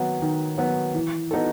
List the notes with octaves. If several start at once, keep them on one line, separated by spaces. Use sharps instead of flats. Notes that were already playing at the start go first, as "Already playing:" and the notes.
Already playing: D#3 F#3 B3
D#3
F#3 B3
E3
B3 D#4 F#4 A4